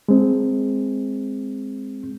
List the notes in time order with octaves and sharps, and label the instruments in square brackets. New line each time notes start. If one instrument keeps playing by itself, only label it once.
[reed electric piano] G#3 C4